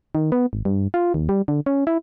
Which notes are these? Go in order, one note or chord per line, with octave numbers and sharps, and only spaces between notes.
D#3
B3
G#1
G2
F4
D#2
G3
D3
C#4
E4